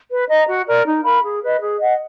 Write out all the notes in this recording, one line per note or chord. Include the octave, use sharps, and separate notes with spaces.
B4
D#5 A#5
F#4
A#4 D5
D#4
A#4 F5 B5
G#4
B4 D#5
G#4
D#5 F#5